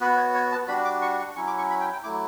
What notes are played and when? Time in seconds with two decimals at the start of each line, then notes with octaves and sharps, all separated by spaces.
0.01 B3 F#4 B4
0.17 C#5
0.34 C#5
0.52 A5
0.68 G3 D4 F#4 B5
0.85 D6
1.02 C#6
1.19 C#6
1.36 F#3 C#4 E4 C#6
1.47 D6
1.58 C#6
1.70 B5
1.80 G5
1.93 G5
2.03 F#3 A3 E4 D6